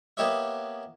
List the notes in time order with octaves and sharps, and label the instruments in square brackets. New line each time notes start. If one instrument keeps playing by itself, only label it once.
[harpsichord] A#3 B3 G4 C#5 D#5 E5